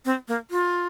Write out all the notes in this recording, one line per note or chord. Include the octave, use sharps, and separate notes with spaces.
C4
A#3
F4